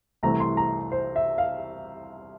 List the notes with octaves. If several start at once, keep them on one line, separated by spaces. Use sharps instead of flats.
C2 C3 E3 A3 C4 A#5
C6
A#5
C5
E5
F5